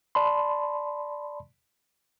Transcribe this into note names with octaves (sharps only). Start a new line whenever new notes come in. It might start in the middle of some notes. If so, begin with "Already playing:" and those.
D5 A5 B5 C6